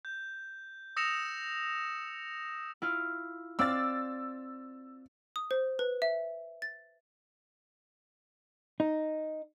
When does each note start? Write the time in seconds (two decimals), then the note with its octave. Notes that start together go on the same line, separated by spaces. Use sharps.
0.05 G6
0.97 D#6 E6 A#6 C#7 E7 F7
2.82 E4 F4 F6
3.59 C4 D5 F5 E6 A6
5.36 D#6
5.51 C5
5.79 B4
6.02 E5
6.62 A6
8.80 D#4